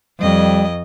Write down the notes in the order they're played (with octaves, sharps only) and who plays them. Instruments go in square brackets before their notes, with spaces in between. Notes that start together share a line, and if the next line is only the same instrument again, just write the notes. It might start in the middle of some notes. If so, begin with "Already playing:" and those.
[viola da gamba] F2 D#5 [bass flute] G3